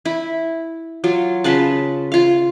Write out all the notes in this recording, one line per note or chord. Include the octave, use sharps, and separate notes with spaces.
E4
F#3 F4
C#3 F4 B4 A5
F4 F5